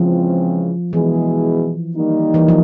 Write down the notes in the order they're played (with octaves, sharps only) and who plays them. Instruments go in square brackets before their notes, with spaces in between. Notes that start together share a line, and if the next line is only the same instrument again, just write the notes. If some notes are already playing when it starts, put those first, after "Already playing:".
Already playing: [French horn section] C#3 E3 G#3 C4 [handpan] F3
[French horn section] B2 G#3 B3 E4 G#4 [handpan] E3
[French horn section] D#3 G3 A#3 D#4
[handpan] E3
F3